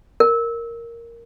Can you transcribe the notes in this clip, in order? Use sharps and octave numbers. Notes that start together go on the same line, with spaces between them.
A#4